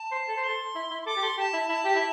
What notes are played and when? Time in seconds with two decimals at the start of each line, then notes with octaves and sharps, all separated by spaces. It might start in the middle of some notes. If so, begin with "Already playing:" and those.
Already playing: A5
0.12 C5
0.28 A4
0.37 C5
0.44 A4 C6
0.75 E4
0.91 E4
1.02 C6
1.06 A4 D6
1.16 G4
1.22 A4 C6
1.37 G4 A5
1.53 E4
1.69 E4 A5
1.85 G4
1.95 E4